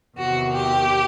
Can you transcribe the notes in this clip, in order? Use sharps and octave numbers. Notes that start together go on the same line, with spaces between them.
E2 C3 D#3 F#4
G4